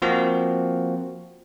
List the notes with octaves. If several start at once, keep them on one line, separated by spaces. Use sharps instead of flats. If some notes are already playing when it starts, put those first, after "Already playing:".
F3 A#3 C4 F#4